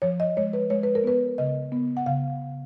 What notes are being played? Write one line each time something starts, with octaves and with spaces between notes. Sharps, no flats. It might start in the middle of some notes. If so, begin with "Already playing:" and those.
F3 C#5
D#5
G#3 C#5
B4
G#3 C#5
B4
A#4
B3 B4
C#3 D#5
B3
F#5
C#3 F5